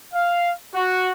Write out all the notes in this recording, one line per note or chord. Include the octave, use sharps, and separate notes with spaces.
F5
F#4